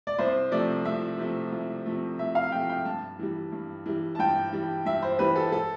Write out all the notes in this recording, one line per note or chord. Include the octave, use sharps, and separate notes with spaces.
D5
C2 C5
C3 F3 A3 D5
C2 E5
C3 F3 A3
C2
C3 F3 A3
C2 E5
F5
C3 F3 A3 G5
G5
G2 A5
E3 G3
G2
E3 G3
A5
G2 G5
E3 G3
G2 E5
C5
E3 G3 B4
A4
A4